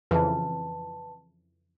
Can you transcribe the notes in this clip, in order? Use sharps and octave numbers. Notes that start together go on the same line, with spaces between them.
F2 C#3 E3 B4 A5